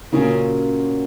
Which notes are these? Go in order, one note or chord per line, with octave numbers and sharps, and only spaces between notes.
A#2 C#3 F#3 A#3 C#4 F4